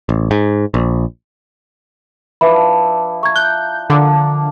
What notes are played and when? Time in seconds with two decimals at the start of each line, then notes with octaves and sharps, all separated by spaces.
0.09 A1
0.31 G#2
0.74 A#1
2.41 F3 D4 E4 B4 E5 B5
3.23 A#5 C#6 G#6
3.36 F#6 G6
3.90 D3 F3 A#3 D4